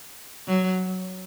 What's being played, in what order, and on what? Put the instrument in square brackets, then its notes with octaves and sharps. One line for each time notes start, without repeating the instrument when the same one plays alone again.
[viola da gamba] F#3